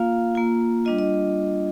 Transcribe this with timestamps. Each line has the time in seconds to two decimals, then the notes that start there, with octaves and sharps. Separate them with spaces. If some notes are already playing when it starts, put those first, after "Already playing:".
Already playing: A#3 F4 F5
0.35 A#3 F4
0.85 G3 D4 F4 D#5
0.99 D#5